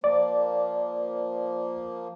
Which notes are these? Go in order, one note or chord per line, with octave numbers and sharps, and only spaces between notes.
F3 A#3 D5